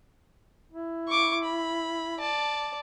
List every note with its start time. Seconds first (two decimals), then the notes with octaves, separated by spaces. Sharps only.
0.72 E4
1.08 C#6 D6
1.43 B5
2.19 D5 A5